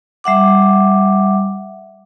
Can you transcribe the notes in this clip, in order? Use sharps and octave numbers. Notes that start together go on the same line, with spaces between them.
G3 E5 F#5 D6